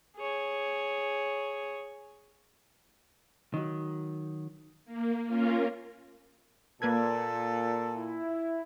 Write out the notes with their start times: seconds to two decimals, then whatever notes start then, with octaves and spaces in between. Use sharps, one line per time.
0.16 G#4 C#5
3.54 D#3 F#3
4.85 A#3
5.27 A#3 C#4 F4 A#4
6.82 A#2 A#3 A4 B4 G#6
7.96 E4